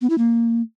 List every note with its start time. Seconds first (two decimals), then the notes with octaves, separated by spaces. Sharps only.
0.01 B3
0.10 E4
0.18 A#3